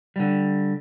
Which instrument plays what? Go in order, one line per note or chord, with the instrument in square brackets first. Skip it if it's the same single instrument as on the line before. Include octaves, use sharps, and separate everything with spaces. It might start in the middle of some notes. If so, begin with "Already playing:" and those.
[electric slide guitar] D3 G3